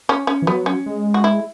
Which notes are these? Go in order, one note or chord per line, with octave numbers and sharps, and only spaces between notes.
C#4
C#4
E3
F#3 B3
C#4
G#3
F#4
E4